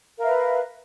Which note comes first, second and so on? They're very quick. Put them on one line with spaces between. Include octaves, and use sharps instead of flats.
A#4 F5 E5 B4